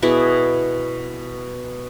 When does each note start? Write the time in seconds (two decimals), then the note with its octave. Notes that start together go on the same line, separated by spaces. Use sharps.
0.02 B2 E4 G#4 D5